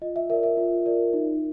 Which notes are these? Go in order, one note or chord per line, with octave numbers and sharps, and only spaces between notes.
F4 D#5
E5
A#4 D5 E5
E5
F4
A#4 D5
D#4